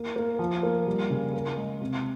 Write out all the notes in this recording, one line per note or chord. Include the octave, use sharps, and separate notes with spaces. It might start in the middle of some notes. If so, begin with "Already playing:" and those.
Already playing: A#3
A#3
F3
A#3
G3
C#3
A#4
G#3
C3